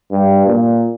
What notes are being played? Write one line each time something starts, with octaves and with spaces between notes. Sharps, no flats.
G2
A#2